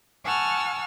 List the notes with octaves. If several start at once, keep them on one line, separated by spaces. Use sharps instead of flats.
F#5 G#5 A5 C#6 E6 F6